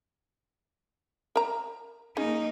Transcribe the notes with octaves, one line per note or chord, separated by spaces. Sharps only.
A#4 A#5
A#3 C#4 D#4 G#4